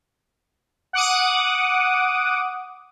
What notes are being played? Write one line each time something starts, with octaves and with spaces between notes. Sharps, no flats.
F#5 D6 D#6